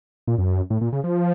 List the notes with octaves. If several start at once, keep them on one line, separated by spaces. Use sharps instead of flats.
A#2
F#2
A2
A#2
C#3
F3